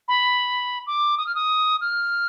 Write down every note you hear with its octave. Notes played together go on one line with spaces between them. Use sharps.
B5
D6
D#6
F6
D#6
F6